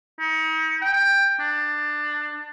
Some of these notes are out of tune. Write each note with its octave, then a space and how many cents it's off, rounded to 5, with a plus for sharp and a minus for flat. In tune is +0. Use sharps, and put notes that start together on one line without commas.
D#4 +40
G5 +15
D4 +20